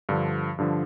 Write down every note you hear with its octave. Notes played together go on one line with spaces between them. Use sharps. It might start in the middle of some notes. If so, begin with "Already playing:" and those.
G2 D3 F3
G2 D3 F3